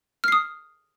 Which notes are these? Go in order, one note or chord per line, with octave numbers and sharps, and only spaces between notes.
D#6 F6 C7